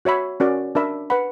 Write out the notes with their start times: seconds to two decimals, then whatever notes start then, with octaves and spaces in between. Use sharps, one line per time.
0.05 F#4 C#5 E5 B5
0.40 C#4 F#4 A#4 D5
0.75 D4 A#4 E5 B5
1.10 B4 F#5 B5